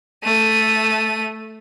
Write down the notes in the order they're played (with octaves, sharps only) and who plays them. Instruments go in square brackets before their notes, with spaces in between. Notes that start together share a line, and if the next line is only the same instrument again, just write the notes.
[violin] A3 D#7